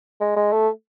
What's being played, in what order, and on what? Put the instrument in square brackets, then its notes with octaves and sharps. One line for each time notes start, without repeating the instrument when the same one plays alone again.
[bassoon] G#3
G#3
A3